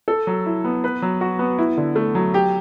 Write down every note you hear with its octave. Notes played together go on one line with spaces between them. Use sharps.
A4
F#3
E4
B3
B4
F#3
F#4
B3
E4
D3
A3
F#3
G4